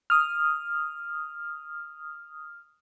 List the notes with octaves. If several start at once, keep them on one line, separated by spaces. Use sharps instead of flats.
D#6 F6